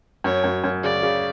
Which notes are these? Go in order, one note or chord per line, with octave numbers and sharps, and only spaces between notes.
F#2 C#5
F#2
F#2
C#3 D5
C#3